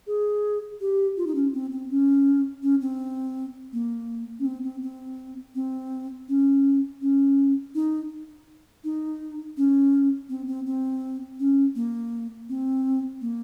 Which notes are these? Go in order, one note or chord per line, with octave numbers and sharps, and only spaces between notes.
G#4
G4
F4
D#4
C#4
C4
C4
C#4
C#4
C4
A#3
C#4
C4
C4
C4
C4
C#4
C#4
D#4
D#4
C#4
C4
C4
C4
C#4
A#3
C4
A#3